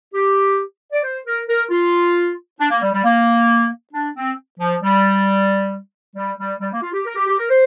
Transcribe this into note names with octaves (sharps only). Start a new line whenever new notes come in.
G4
D5
C5
A#4
A#4
F4
D4
A#3
G3
G3
A#3
D4
C4
F3
G3
G3
G3
G3
A#3
F4
G4
A#4
G4
G4
A#4
C5